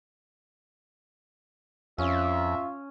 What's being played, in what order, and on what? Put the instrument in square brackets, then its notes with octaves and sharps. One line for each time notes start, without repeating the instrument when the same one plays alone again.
[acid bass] F2 [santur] C#4 [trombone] F4 [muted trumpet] E5